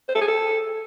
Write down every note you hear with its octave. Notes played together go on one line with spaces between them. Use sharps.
C5
A4
G#4
A4